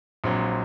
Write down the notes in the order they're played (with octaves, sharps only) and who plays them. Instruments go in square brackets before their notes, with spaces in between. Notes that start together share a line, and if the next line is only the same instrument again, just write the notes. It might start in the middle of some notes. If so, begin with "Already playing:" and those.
[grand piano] A#1 A#2 F#3 C4